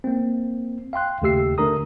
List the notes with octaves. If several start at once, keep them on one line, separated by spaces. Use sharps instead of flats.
A#3 C4
F5 G5 C6 F#6
D#2 C#3 A3 G4 E6 C7
D3 A3 D4 A#4 A#5 D#6